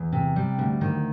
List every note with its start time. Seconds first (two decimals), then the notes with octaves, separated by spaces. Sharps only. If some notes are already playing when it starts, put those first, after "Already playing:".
Already playing: E2
0.13 C3
0.36 G3
0.59 D2
0.81 D#3